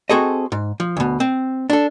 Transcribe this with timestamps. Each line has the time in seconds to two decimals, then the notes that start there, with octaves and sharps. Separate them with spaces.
0.10 C4 F#4 G#4 A4 C5 D#5
0.52 G#2
0.80 F3
0.97 D2 B2
1.20 C4
1.70 D4 A4